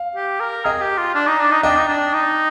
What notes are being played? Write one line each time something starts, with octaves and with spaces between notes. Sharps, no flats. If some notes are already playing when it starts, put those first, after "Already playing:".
Already playing: F5
G4
A#4
G#4 D#5 G5
G4
F4
D4
D#4
D4
D#4
D4 D#5 G5
D#4
D4
D#4